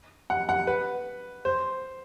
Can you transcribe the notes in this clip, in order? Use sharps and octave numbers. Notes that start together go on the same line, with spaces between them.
F#5
F#5
B4
C5